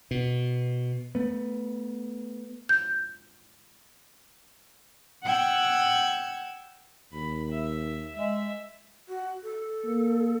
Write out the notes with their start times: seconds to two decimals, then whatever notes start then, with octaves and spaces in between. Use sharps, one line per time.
0.11 B2
1.15 A3 B3
2.69 G6
5.23 F#5 G5 E6 F#6 G#6
7.12 D#2 B5
7.51 E5
8.15 G#3 E5
9.08 F#4
9.43 A4
9.84 A#3